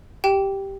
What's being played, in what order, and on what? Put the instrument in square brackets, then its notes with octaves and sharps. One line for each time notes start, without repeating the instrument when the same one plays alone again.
[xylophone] G4 G5